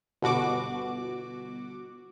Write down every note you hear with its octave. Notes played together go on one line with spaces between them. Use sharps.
G1 B2 F#4 D6